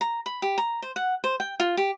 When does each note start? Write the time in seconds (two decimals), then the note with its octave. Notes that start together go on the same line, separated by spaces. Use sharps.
0.01 A#5
0.26 B5
0.42 G4
0.58 A#5
0.82 C5
0.96 F#5
1.24 C5
1.40 G5
1.60 F4
1.77 G4